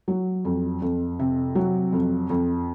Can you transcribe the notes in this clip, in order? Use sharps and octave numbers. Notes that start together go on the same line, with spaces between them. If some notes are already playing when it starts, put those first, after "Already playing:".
F#3
F2
F2
C3
F#3
F2
F2